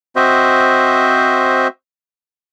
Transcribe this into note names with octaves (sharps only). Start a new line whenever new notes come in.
C4 F#4 C5 D#5 E5